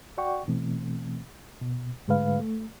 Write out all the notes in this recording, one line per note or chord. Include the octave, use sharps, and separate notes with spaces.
F#4 D5 F#5 G5 C#6
B2 E3 A3 C4
B2
G#2 D3 G#3 A3 B4 F5
A3